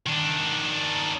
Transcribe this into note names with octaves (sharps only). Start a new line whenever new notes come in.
D#3 D4